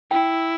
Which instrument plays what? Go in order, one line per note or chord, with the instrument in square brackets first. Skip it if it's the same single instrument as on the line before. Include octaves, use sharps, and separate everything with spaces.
[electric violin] E4 [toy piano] G5